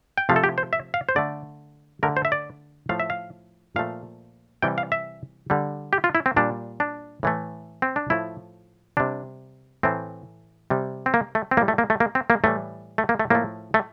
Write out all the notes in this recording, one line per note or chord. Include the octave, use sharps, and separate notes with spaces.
G5
C3 F3 A3 F5
A4
G4
C5
E5
F5
C5
D3 A3 D5
D3 A3 A#4
C5
E5
D5
A2 F3 A3 F5
E5
F5
A#2 F3 A3 F5
C3 E3 G3 G5
F5
E5
D3 G3
G4
F4
E4
C4
A#2 G3 D4
D4
A2 E3 A3
C4
D4
A2 F3 A3 E4
C3 G3 D4
A2 E3 A3 C4
C3 G3
C4
A#3
A3
C4
A2 G3 A#3
A3
A#3
A3
A#3
C4
A#3
A2 E3 G3 A3
A3
A#3
A3
A2 F3 A3 A#3
A3